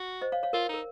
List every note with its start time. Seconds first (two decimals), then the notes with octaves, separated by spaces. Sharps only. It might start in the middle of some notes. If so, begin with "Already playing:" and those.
Already playing: F#4
0.21 C5 D#5
0.32 C#5 F5
0.43 C#5 F5
0.53 F4 A#4 C#5
0.69 D#4 A#4